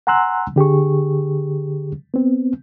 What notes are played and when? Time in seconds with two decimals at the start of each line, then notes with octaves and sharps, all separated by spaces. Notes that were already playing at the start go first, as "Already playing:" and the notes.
0.07 F#5 G#5 A#5 C6 E6 F#6
0.56 D3 G4 G#4 C#6
2.14 B3 C4